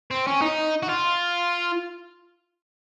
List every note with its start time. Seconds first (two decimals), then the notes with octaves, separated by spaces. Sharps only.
0.11 C4
0.27 C#4
0.42 D#4
0.83 F#4
0.89 F4